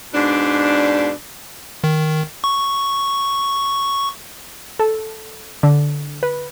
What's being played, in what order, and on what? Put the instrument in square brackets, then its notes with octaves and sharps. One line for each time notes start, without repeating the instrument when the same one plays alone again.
[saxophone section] G#2 B2 D4
[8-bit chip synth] D#3
C#6
[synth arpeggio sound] A4
D3
B4